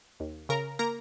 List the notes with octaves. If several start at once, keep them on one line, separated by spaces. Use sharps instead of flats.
D#2
C#3 A#4 A#5
A#3 A#4 A#5